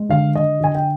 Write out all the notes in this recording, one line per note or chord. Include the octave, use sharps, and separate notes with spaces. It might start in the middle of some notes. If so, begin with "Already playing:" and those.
Already playing: G#3
D3 F5
D3 D#5
D3 G#5
G5